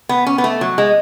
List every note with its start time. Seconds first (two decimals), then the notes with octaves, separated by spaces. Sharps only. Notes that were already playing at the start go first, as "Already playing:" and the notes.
0.09 B3
0.26 C#4
0.38 B3
0.44 A3
0.61 F#3
0.78 G#3